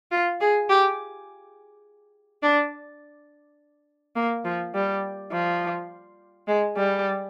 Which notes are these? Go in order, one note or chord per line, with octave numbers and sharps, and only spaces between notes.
F4
G#4
G4
D4
A#3
F3
G3
F3
G#3
G3